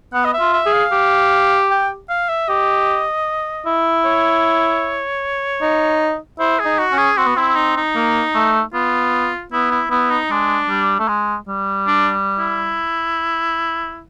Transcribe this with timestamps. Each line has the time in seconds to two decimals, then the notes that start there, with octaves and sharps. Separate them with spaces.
0.13 B3 F#5
0.25 D#5
0.34 E5
0.40 F4
0.53 E5
0.66 G#4
0.73 F5
0.92 G4
1.71 G5
2.10 F5
2.29 E5
2.49 G4 D#5
3.66 E4
4.05 C#5
5.62 D#4
6.39 E4 C5
6.59 G#4
6.65 D#4
6.79 F#4
6.92 C#4
6.98 G#4
7.18 C4 F#4
7.26 B3
7.36 C4 E4
7.56 D#4
7.76 D#4
7.95 A#3
8.35 A3
8.73 B3 F4
9.52 B3 E4
9.71 E4
9.91 B3 E4
10.11 D#4
10.30 G#3 D4
10.69 G3
10.99 A3
11.08 G#3
11.48 G3
11.87 D4
12.39 E4